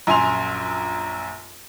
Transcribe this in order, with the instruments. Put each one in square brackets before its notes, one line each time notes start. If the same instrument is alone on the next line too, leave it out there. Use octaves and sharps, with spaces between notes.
[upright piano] A#1 F#2 G#5 C6 F7